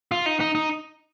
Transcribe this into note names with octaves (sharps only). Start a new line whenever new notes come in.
F4
D#4
D#4
D#4